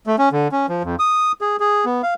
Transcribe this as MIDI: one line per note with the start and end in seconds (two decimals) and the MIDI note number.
0.07 0.16 57
0.18 0.29 61
0.32 0.48 50
0.52 0.66 61
0.69 0.83 53
0.84 0.96 41
0.99 1.32 87
1.41 1.56 68
1.60 1.85 68
1.85 2.02 59
2.03 2.14 77